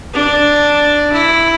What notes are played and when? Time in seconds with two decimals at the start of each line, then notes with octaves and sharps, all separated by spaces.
0.14 D4
1.13 E4